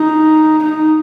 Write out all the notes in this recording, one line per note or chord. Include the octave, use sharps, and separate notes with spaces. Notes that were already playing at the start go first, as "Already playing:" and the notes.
Already playing: D#4
D#4